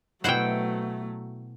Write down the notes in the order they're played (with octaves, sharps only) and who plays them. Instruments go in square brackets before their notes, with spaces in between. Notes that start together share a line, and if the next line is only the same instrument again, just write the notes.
[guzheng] B2 E4 C5 [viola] F#3 A3 [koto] F#5 G5